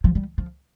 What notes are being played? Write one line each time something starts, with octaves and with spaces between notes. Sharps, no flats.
F3
G3
F3